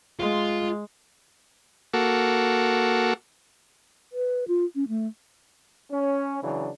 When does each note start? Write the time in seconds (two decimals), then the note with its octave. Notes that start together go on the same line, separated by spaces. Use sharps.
0.20 G#3 F4
1.94 A#3 F#4 A4
4.13 B4
4.48 F4
4.75 C#4
4.88 A3
5.91 C#4
6.42 C#3 E3 F#3 D4